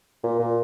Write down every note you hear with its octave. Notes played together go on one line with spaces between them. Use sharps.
A#2
A#2